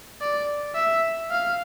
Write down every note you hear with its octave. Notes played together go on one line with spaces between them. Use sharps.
D5
E5
F5